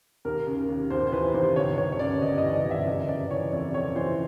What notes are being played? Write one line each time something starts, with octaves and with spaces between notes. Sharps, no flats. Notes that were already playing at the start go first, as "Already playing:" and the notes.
D#2 A#4
C#3
D#2
D#2 C5
C5
E3 B4
D#2 C5
G1 C#5
G1 C#5
C#5
C#3 D5
G1 D#5
E3 D#5
D5
G1
E5
F#1 D#5
F#1 D5
E3 C#5
F2 D5
F2 C#5
E3 C5